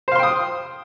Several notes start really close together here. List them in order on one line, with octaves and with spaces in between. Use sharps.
C5 F5 C6 G5 D#6